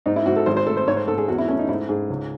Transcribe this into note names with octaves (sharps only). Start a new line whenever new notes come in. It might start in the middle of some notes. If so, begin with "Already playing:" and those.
G#2 D#4
E4
G#2 F#4
A4
G#1 C5
C5
A3 A4
C5
G#2 C#5
C5
G#2 A4
G#4
E2 F#4
E4
A3 C#4
D#4
G#2 E4
G#2 G#4
C#2